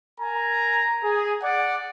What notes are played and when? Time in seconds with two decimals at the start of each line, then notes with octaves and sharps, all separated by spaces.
0.19 A#4 G#5 A#5
1.03 G#4
1.42 D5 F#5